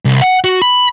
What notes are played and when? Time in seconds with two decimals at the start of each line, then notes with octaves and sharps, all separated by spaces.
0.05 C2
0.22 F#5
0.44 F#4
0.62 B5